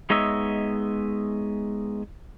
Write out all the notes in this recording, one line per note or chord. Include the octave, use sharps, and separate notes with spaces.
G#3 B3 D#4 C#5 D#5 E5